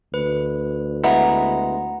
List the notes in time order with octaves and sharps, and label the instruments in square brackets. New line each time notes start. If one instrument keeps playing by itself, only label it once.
[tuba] D2 [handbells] B4
[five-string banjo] G#3 B3 E4 [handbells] F#5 A#5